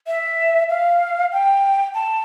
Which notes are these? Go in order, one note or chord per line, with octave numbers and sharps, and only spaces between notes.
E5
F5
G5
A5